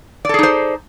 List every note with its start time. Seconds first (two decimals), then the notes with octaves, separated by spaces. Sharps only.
0.25 D5
0.29 A4
0.34 G#4
0.39 D#4
0.43 C5